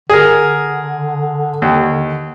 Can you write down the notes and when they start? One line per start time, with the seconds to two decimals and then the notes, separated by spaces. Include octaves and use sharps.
0.10 D3 G#4 A#4
1.62 D#2